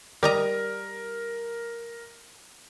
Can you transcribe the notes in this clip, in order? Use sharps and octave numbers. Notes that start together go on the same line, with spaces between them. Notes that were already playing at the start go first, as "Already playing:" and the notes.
G3 A#4 D#5 A#5